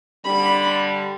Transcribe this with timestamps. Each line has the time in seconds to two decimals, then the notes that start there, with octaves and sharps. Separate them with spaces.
0.24 D3 G3 B5